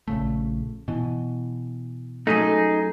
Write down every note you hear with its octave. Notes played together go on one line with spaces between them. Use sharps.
A#1 C#3 A3
B2 E3
F#2 A3 D#4 G#4